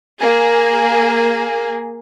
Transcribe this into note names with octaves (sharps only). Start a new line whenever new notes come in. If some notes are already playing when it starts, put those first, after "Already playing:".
A#3 G#4